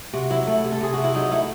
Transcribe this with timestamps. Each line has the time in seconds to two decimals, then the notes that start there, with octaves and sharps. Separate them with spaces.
0.14 C3 F#4
0.30 F#3 E4
0.47 A3
0.64 C3
0.72 A4
0.81 C3 G#4
0.94 C3 F#4
1.04 E4
1.15 F#3 D#4
1.31 A3 E4